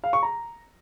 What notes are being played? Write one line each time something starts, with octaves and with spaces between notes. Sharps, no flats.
F5
C#6
A#5